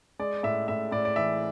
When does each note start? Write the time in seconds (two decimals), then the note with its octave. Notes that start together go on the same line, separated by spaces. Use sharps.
0.19 G#3 D5
0.43 A2 E5
0.68 A2 E5
0.92 A2 D5
1.05 D5
1.16 E3 E5